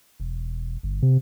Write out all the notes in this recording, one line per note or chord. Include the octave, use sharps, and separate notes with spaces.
E1
G1
C3